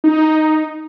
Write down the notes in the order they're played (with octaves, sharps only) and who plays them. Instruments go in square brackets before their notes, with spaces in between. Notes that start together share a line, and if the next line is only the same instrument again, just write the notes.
[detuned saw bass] D#4